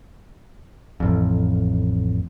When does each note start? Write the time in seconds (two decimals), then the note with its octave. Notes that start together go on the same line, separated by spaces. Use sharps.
1.00 A1 F2